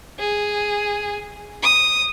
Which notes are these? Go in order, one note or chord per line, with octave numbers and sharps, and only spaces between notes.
G#4
D#6